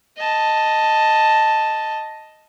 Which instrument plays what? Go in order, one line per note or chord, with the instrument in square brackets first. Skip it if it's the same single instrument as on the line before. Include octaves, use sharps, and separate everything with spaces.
[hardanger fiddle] D#5 A5